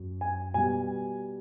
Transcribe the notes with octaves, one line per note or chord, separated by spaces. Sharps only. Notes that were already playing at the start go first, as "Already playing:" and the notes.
Already playing: F#2
G#5
B2 G3 G#5